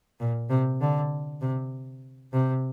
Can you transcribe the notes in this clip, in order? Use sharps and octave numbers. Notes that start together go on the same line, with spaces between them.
A#2
C3
D3
C3
C3